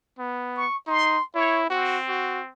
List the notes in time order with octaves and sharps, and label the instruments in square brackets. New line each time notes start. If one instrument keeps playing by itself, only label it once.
[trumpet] B3
[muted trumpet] C#6
[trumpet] D#4 [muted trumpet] C6
[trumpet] E4 [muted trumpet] C#5
[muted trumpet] C4 [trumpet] F#4
[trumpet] F#4